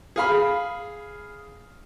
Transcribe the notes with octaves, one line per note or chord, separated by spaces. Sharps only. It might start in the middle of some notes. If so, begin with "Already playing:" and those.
G#4 F5 B5